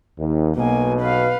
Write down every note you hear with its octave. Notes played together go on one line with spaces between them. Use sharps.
D#2
B1 B2 A#3 G#5
B4 F5